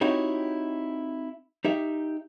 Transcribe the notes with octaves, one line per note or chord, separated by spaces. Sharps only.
C4 D#4 E4 F#4 G4 C#5
D#4 G4 E5